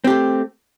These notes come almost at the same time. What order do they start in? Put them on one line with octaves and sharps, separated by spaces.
C4 G4 A3